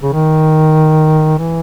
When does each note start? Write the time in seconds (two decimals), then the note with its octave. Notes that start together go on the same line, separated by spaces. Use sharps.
0.03 C#3
0.13 D#3
1.38 E3